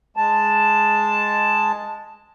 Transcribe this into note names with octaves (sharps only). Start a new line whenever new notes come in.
G#3 A5